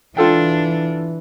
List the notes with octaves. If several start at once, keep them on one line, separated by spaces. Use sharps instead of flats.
E3 D4 F4 A4 G5